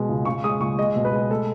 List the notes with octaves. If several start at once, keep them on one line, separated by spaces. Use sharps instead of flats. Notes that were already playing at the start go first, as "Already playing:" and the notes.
Already playing: B2 G#3
C#2
C#3 C#6
G#3 D#6
C#2 C#6
G#3 D#5
B2
B4
G#3
A3 A4